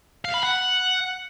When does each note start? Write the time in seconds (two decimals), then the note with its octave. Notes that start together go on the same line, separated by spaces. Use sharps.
0.25 F5
0.34 B5
0.43 F#5